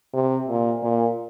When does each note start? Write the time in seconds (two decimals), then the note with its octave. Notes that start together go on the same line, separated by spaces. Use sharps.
0.14 C3
0.48 A#2
0.83 A#2